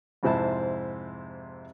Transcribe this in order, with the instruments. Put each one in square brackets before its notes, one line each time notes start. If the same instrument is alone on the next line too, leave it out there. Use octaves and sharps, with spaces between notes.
[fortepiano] F2 G#2 C3 E4 C5 A5